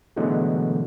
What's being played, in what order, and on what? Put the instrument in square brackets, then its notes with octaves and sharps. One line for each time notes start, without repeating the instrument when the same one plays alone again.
[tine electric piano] B2 D3 E3 F#3 G#3 A3